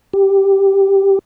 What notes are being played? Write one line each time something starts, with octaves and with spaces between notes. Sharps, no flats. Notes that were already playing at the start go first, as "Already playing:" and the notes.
G4